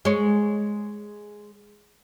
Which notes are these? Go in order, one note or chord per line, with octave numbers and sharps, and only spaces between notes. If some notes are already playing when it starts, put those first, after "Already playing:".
G#3 C#5